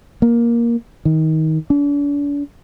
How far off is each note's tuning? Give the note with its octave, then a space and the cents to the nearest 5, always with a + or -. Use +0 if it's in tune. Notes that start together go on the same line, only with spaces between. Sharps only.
A#3 +10
D#3 +25
D4 -40